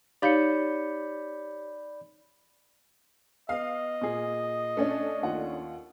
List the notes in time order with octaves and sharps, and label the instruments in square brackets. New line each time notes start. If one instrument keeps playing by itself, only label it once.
[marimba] D#4 F5 [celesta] G4 C#5 C#7 [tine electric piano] D5 B5 G6
[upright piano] B3 [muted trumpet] D#5 [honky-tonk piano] F5
[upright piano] A#2 G#4
[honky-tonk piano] A3 C#4 D4
[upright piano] D#2 F4 F#5